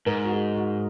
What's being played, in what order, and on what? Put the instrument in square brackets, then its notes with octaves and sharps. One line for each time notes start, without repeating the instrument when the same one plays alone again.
[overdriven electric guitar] G#2 [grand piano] A#4
[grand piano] F#4
G#4
F#4